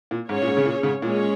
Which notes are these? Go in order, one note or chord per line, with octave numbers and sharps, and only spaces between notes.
A#2
G#2 C#4 G#4 C#5
A#2
G#2
C#3
A#2
G#2 C#3
A#2 G#3 C#4 G#4 C#5